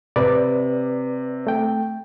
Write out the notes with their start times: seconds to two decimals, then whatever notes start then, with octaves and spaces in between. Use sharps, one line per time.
0.16 C3 B4 D5
1.47 A3 G5